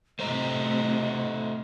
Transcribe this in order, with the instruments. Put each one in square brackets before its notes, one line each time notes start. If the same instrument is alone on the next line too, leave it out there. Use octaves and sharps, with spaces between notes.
[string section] A2 C3 [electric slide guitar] A3 C5 A#5 [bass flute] D#5